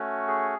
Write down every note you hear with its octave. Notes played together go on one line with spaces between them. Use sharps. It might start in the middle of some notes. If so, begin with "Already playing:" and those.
Already playing: A3 C#4 F#4
G#4